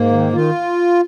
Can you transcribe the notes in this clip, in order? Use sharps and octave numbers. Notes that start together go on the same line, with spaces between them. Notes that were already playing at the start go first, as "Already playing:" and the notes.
Already playing: G#2 A#3
D#3
D#3 F4